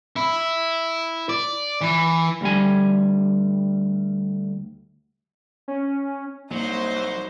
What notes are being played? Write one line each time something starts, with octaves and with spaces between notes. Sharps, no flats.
E4
D5
E3
D2 G3 G#5
C#4
C2 F#3 A#3 D#4 C5